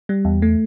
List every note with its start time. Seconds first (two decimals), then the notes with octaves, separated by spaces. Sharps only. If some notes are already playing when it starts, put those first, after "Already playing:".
0.09 G3
0.25 E2
0.42 A3